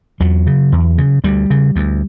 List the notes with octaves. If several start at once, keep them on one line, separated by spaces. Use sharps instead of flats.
E2 F#3
C#3
E2
C#3
D2 G3
C#3
D2